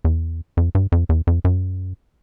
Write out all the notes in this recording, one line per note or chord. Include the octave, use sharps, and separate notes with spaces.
E2
F2
G2
F2
E2
F2
F#2